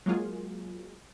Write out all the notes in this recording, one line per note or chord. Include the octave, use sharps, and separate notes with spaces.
F#3 G#3 A#3 F4 G#4